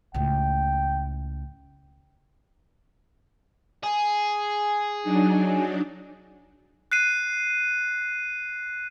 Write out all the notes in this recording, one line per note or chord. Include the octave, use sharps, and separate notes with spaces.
C#2 A2 G5
G#4
F#3 D4 D#4
F#6 C7 D#7